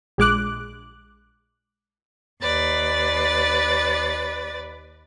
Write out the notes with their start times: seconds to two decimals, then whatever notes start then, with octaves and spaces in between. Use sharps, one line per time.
0.18 A#1 G#3 D6 F#6
2.41 D#2 B4 D5 A6